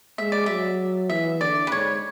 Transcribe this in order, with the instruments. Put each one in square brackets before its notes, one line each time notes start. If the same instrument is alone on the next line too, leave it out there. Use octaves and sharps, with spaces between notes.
[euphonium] G#3 [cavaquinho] E5
[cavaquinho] D5
[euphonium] F#3 [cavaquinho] E5
[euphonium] E3 [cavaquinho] E5
[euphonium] D3 [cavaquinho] D5
[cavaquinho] B4
[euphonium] G#2 [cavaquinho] C#5